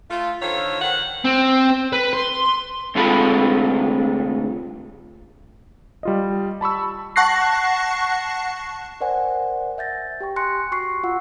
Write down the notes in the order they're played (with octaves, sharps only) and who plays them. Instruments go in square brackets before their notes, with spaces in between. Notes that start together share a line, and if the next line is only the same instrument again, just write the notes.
[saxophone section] A3 F4
D3 D#3 F4 A4 C5 C#5
D#3 F3 F#5
[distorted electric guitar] C4
B4
C6
[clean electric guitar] D2 C3 G#3 F4 A4 B5
[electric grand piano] G3 F4 D#5
A5 B5 C#6 E6
[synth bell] F#5 A5 C#6 F#6 A#6 C7
[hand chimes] A#4 C5 D5 F#5 G#5
E5 G6 A6 A#6
G4 G5 C#6
G#5 C6 F#6 A#6 C#7
F#4 C#6 C7
F4 F#5 C#6 E6